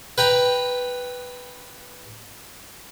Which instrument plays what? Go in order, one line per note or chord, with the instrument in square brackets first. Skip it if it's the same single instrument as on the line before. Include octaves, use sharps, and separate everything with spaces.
[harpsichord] B4 G5 A#5